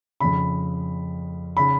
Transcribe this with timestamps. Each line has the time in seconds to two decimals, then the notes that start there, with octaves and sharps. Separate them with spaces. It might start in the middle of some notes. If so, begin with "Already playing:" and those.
0.20 F2 C#3 B5
1.57 C#3 B5